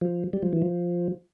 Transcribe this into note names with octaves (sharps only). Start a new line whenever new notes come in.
F3
G3
F3
E3
F3